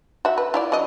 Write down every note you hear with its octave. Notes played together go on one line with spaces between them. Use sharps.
F#4 E5
B4
E4 F4 D5
F#3 D4 D#5